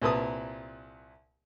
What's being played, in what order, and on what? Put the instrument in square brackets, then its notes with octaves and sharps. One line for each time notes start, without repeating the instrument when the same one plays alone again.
[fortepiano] C2 A#2 B4 A5 D#6